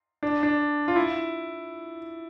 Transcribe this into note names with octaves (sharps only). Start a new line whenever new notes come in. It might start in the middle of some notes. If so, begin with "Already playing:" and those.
D4
D4
F4
E4